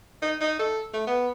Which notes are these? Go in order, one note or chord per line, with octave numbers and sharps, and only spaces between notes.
D#4
D#4
A4
A3
B3